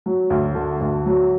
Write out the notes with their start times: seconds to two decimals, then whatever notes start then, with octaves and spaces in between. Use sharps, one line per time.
0.06 F#3
0.30 D2
0.55 D3
0.81 D2
1.06 F#3